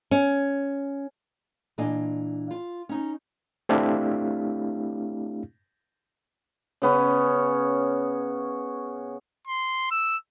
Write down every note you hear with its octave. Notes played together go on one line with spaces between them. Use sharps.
C#4
A#2 E3 D4 D#5 G#5
F4
C#4 D#4
A3 C4 D4 E4 G4 F5
C#3 B3 C#4
C6
E6